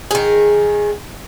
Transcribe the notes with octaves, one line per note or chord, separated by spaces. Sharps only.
D#3 G#4